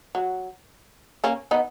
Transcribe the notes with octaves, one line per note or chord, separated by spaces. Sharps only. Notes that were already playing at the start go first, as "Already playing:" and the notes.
F#3
A#3 C#4
B3 D#4